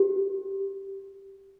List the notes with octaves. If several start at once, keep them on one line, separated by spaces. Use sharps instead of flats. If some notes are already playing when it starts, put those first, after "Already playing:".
Already playing: G4